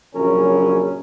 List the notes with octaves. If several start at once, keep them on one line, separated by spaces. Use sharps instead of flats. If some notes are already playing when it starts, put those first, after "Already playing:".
A#1 F#2 C#3 C#4 A#4